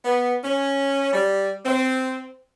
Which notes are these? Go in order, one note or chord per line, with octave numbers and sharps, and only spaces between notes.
B3
C#4
G3
C4